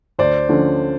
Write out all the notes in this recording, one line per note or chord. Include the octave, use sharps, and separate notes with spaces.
D2 C5 D5
D3 F3 A3 C#4